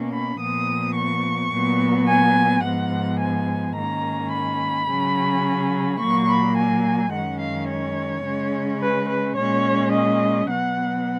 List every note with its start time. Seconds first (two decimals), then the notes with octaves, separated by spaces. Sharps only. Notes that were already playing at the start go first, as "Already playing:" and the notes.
Already playing: B2 A#3 C#4
0.13 B5
0.40 A#2 F3 B3 D#6
0.96 C#6
1.52 A#2 F#3 B3
2.08 G#5
2.64 G#2 F3 B3 F#5
3.20 G#5
3.76 G#2 D#3 A#3 C#4 A#5
4.33 B5
4.89 C#3 F#3 C#4
6.00 A#2 F#3 A#3 C#6
6.29 B5
6.57 G#5
7.13 F#2 D#3 G#3 C#4 F#5
7.41 F5
7.69 C#5
8.25 C#3 G#3 C#4
8.81 B4
9.10 B4
9.37 A#2 G#3 C#4 C#5
9.93 D#5
10.49 B2 F#3 B3 F#5